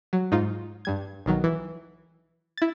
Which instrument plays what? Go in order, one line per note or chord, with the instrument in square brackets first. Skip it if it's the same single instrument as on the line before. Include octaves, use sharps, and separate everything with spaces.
[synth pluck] F#3
G#2 D#4 F4
G2 G3 G#6
B1 D#3 F#3
E3
E4 A6